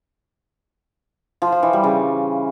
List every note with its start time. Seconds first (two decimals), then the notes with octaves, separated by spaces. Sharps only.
1.42 F3
1.52 F3
1.63 E3
1.73 G3
1.84 C#3